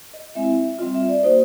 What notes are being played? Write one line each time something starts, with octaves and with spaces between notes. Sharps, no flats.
D#5
G#3 C4 E4 E5
G3 C4 F4 D#5
E5
D5
A#3 D#4 F#4 C5